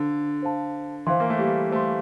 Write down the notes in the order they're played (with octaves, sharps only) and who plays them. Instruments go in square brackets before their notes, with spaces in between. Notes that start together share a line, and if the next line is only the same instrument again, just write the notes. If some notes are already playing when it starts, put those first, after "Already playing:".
Already playing: [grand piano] D3 [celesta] A4 C5 F5 A5
[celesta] A4 C5 F5 A5
[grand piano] E3 [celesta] C5 F5 C6
[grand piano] A#3
A3
G3
[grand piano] A3 [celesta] C5 F5 C6